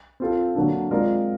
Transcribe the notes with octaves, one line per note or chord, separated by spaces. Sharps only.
C4 F4 A4
D3 F#3 A#3 D4
G#3 C4 F4 A#4 D5